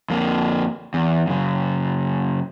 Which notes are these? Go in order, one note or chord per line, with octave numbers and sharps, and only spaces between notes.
F2 A#3
E2
F#2 C#3